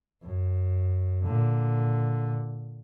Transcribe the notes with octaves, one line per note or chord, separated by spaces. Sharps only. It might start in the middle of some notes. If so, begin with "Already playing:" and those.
F#2
A#2 D3